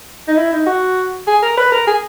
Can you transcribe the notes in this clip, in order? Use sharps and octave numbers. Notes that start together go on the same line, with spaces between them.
D#4
E4
D#4
F#4
G#4
A#4
B4
A#4
G#4